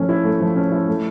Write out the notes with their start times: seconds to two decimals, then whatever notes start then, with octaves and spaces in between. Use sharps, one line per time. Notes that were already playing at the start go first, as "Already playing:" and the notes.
Already playing: F3 A3 C#4
0.09 E4
0.24 A3
0.40 F3
0.56 C#4
0.72 E4
0.88 A3